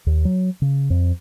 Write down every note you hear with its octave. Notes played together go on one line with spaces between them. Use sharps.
D#2
F#3
C#3
F2